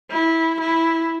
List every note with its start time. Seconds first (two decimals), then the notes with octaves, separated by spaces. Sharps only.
0.11 E4
0.61 E4